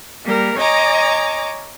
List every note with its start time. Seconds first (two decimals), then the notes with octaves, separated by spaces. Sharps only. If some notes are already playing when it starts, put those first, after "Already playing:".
0.24 G3 A#3 A#4
0.58 C#5 D#5 G#5 A#5 D6